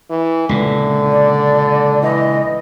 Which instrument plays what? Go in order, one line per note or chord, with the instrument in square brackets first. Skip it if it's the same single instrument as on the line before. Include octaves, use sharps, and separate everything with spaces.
[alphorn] E3
[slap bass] C#2 A#2 [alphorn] D3
[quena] D5
[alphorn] E3 [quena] D#5